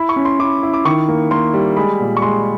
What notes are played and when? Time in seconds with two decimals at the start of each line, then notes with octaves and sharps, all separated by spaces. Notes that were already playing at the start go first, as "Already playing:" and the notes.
Already playing: E4 B5
0.09 C#6
0.16 C#4
0.25 C6
0.39 E4 D6
0.63 E4
0.74 D6
0.85 D#3 C#6
1.08 A#3
1.31 A#3 C6
1.54 G3
1.77 G#3 B5
2.00 A#2
2.17 C#6
2.22 G#3 C6